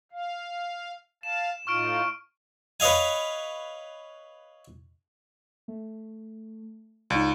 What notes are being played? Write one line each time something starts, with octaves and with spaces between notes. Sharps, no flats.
F5
F5 A5 E7
A2 D#4 F4 C#6 F6 D7
B4 C#5 D#5 F5 G#5
A3
C#2 D#4 D5